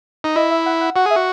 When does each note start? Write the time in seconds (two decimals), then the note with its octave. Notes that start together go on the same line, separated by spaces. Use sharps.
0.24 D#4
0.36 E4 D#5
0.51 E5
0.66 F#5
0.81 F#5
0.96 F#4 F#5
1.06 G#4 E5
1.16 F#4